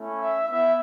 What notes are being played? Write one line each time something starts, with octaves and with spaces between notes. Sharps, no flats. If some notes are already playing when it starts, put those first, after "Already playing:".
Already playing: A3 C#4 E4
E5
B3 E4 E5